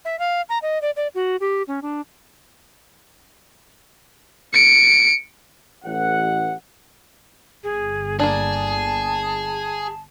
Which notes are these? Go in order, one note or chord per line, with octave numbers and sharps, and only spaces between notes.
E5
F5
A#5
D#5
D5
D5
F#4
G4
C#4
D4
C#7 D7
A1 F#5
G1 G#4
A#3 D4 G#4 A5